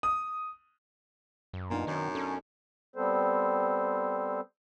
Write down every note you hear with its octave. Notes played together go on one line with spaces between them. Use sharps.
D#6
F#2
A#2 B3 D4 D#4
F#2 D#3
C#4 A4
G3 B3 C4 A4 C5